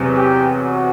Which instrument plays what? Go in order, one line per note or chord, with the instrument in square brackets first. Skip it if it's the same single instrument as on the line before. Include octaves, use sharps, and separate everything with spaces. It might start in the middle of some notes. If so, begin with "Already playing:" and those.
Already playing: [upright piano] E2 C3 F#3
[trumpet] G4
F#4